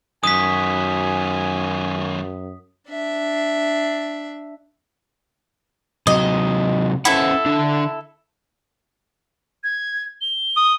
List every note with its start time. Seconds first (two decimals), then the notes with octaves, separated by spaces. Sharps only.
0.23 F#2 D#3 F#3 G#5 D#6 B6
2.89 D4 E5
6.07 C3 F#3 D#5
7.05 C#4 E4 A4 C5 F#5
7.46 D3 D4
9.64 G#6
10.21 G7
10.57 D#6